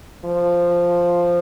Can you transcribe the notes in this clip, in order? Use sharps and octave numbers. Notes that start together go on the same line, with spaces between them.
F3